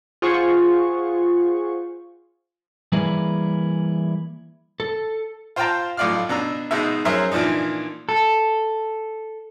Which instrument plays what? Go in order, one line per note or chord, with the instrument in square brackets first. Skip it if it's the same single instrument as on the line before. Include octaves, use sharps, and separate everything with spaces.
[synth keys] F4 G#4 C5 F#5 C#6
[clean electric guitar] E3 G3 A#3 E4 G#4 B4
A4
[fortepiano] F4 C5 F5 G5 A5 A#5
B1 A2 F4 D5 F5 F6
B2 D4 A#5 E6
G#2 B2 G#3 D#4 E5
F#3 C#4 G#4 A#4 C5 E5
A#2 E3 F3 D4 D#4
[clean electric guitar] A4